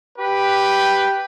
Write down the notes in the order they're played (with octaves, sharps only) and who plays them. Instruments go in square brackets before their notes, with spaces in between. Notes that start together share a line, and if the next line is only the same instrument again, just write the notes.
[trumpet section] G4 B4